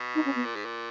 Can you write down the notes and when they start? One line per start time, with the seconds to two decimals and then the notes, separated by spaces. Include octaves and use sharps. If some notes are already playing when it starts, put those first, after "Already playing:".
Already playing: B2
0.15 D#4
0.26 C#4
0.35 B3
0.45 A#2
0.56 G#2
0.65 A#2